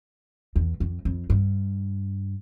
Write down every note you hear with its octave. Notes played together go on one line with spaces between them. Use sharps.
E2
F2
F2
G2